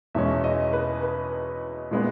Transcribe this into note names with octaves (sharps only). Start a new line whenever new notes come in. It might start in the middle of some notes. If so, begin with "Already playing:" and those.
E2 B2 G#3 C#4 E5
D#5
B4
B4
A#2 G#3 B3